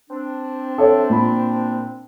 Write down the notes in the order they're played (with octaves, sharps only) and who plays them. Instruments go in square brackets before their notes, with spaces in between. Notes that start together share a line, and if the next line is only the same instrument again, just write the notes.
[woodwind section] C4 D4
[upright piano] A4 C#5 E5
A#2 B5